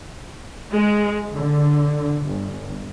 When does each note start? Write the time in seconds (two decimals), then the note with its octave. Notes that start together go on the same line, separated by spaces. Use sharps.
0.72 G#3
1.33 D3
2.23 G1